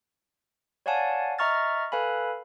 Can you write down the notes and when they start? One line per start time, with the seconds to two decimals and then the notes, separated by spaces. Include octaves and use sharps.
0.86 C#5 D5 F5 F#5 G#5 A5
1.39 D#5 E5 A#5 C#6 F6 A6
1.92 A4 B4 F5 G#5 B5